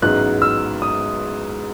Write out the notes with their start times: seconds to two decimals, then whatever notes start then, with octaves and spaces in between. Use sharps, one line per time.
0.02 A1 G#2 F#3 B3 D#4 F#6
0.42 E6
0.82 D#6